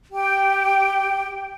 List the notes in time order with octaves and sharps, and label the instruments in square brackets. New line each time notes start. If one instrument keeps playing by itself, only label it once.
[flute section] G4 G5